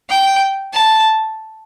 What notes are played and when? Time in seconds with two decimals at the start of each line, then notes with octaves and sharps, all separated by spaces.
0.10 G5
0.74 A5